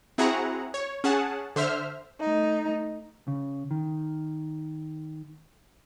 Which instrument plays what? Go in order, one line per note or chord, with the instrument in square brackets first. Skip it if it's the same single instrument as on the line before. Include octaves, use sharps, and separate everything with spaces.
[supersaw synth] C4 E4 F#4 G#4 F#5 A#5
C#5
C#4 G#4 F#5 A5
D3 C5 E5 F6
[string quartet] A3 D#4
[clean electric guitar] C#3
D#3